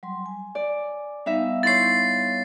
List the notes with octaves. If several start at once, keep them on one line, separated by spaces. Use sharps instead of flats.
F#3 G3 C6
G#5
D5
G3 B3 D#4 E5 F5
E4 C5 C#5 A6 C7